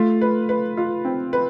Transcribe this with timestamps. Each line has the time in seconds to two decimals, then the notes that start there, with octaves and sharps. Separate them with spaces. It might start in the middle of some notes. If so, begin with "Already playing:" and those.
Already playing: A3 F4
0.21 B4
0.49 B4
0.77 F4
1.05 C4
1.33 B4